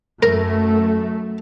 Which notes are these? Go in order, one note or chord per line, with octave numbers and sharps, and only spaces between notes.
F#2 A3 A#4